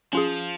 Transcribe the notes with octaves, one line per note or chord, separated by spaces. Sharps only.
F3 C#4 F4 G#4